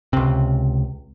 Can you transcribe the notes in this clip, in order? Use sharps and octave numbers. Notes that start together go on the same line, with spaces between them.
C#2 C3